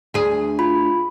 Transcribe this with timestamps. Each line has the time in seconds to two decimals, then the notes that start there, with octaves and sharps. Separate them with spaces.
0.14 D2 G#4
0.59 F4 B5